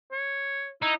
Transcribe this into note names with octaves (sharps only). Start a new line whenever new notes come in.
C#5
D#4 E4